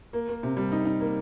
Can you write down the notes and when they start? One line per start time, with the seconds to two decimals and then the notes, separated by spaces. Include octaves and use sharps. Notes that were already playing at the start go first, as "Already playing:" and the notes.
0.13 A#3
0.28 A#3
0.43 C3
0.57 G3
0.72 D#4
0.85 D#4
1.01 A#3